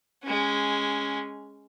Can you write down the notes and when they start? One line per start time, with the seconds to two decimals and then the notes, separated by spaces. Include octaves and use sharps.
0.23 G#3 C#4